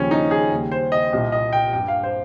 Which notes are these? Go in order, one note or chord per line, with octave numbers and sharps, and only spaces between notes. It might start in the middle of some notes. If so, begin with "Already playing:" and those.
Already playing: D#2 C#3 F3 C#4
D#4
G#4
D#2 C#3 G3
C5
D#5
C2 A#2 G3 D#5
D#5
G5
G2 G3 G5
F5
C5